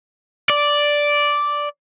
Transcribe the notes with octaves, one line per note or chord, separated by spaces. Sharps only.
D5